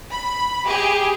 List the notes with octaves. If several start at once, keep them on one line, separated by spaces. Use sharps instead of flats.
B5
G4 G#4